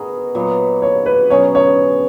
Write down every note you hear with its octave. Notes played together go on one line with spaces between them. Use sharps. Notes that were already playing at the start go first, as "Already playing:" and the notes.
Already playing: B3 F#4 G#4 A#4 D#5
A#2 F#3 B3
C#5
B4
B2 F#3 C#4 G#4 C#5
C#5